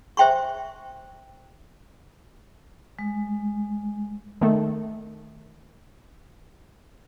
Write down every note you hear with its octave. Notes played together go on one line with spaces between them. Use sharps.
C5 E5 G5 C6 C#6
G#3
D#3 A3